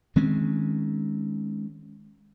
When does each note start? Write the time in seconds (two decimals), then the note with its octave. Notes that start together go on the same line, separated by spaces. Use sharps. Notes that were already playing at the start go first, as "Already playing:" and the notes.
0.16 D#3 G#3 C4 C#4